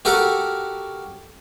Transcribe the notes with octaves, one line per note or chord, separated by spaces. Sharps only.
F#4 G4 A4 A#4 F#5